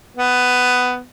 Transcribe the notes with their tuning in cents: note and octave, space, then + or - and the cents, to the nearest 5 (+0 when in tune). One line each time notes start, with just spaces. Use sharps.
B3 +10